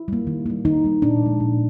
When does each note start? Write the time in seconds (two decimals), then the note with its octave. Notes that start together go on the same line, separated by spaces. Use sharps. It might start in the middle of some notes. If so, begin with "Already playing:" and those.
Already playing: E4
0.08 G3 A#3
0.27 D#3
0.46 G3 A#3
0.65 D#3 D#4
0.84 G3 A#3
1.02 A#2 D4
1.22 F3 G#3
1.40 A#2